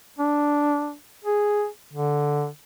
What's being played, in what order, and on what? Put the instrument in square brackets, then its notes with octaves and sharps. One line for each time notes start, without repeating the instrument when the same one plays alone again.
[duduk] D4
G#4
D3